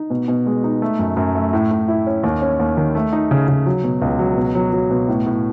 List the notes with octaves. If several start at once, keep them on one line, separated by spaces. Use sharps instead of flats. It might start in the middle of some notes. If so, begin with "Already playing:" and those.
Already playing: D#4
B2
B2
G#3
D#4
A3
F#2
F#2
A3
A2
A2
E4
C#4
D#2
C#4
D#2
D#3
A3
D#4
C#3
C#3
F#3
B2
C#2
F#3
B2
F#3
F#3
B2
A2
A2